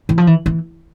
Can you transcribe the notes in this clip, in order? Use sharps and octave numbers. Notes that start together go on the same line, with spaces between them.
E3
F3
E3
E3